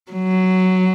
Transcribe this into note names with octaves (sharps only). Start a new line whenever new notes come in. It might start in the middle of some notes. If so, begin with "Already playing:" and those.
F#3